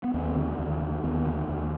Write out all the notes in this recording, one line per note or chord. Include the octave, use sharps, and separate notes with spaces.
B3
D#2 C4
D3
D#2
D3
D#2 B3
D3
D#2